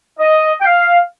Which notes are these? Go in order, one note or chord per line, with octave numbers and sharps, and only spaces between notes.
D#5
G5
F5